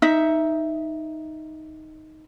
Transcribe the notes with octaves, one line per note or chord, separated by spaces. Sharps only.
D#4 E5